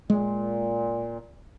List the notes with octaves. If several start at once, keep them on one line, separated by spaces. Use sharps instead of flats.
A#2 G#3